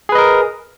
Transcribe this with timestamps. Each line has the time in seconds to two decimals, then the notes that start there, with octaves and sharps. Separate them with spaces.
0.09 G#4
0.12 B4
0.15 D#5
0.18 A#4